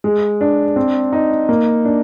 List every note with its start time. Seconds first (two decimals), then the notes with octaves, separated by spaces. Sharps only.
0.04 G#3
0.41 D4
0.76 C4
1.13 D#4
1.49 A#3
1.85 D4